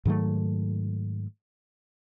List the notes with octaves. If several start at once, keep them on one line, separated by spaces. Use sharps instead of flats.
G#2 D#3 F#3 A3